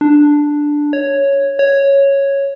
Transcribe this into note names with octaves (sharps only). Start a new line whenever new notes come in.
D4
C#5
C#5